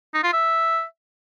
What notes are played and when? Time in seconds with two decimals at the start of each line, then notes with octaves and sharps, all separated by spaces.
0.14 D#4
0.24 F4
0.33 E5